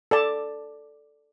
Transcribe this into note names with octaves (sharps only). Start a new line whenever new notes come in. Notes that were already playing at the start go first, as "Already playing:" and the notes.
A4 D5 A5